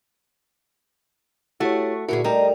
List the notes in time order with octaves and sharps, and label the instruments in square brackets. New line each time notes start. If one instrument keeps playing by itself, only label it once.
[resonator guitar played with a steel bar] A3 F#4 [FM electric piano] E4 G4 C#5
[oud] D2 A#2 G#4 [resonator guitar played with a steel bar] E4 [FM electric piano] F#4 A#4 F#5
[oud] G3 [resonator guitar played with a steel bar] D#4 [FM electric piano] A4 A#4 G5